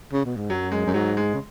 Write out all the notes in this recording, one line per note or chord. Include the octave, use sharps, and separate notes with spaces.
C#3
B2
G#2
F#2 F#3
G#3
F#2
G#2 F#3
G#3
C#3